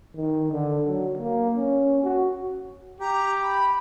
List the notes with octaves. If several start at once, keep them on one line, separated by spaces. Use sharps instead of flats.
D#3
D3
F#3
A#3
C#4
F#4
G4 A#5
B5